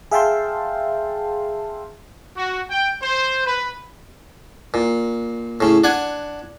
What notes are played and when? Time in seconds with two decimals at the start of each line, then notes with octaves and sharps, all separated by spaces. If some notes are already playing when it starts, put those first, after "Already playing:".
0.11 G#4 E5 F5 G5 A5 C6
2.36 F#4
2.70 G5
3.02 C5
3.45 B4
4.74 A#2
5.61 A2 C#3
5.84 D4 F#5 G#5